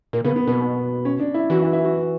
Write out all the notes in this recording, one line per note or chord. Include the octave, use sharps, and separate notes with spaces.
A#2 A#3
C#3 B3
B3
B2 B3
C#4
D4
E4
E3 F#4
E4
E4
F#4